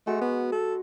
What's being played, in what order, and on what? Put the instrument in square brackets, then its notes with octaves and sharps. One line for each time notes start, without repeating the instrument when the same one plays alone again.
[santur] G#3 F#4 C#6 [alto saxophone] A3
[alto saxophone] B3
A4